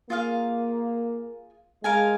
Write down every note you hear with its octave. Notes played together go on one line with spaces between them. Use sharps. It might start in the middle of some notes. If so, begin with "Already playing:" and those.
A#3 F4 G#4 F5
G#3 A#4 F5 G#5